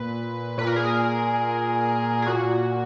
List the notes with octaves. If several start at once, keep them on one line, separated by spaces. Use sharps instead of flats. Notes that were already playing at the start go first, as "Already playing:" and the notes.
Already playing: A#2 B4
A#2 B4
A#4
G#4
A#4
G#4
A#2 F#4